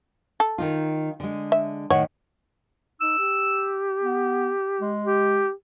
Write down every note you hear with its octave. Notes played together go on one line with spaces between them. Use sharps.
A4
D#3 D#4 F4
D3 G#3
E5
A2 D#3 C#5 F#5
D#4 E6
G4
B3
G#3
G4